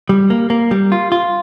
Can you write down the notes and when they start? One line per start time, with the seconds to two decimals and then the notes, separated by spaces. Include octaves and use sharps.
0.09 G3
0.30 A#3
0.50 A#3
0.71 G3
0.92 F4
1.12 F4